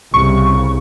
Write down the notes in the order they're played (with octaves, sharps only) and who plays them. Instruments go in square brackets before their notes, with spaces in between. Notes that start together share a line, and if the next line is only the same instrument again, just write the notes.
[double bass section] C2 C#3 [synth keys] C#6